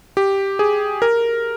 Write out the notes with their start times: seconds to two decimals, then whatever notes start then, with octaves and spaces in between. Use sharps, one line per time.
0.17 G4
0.59 G#4
1.02 A#4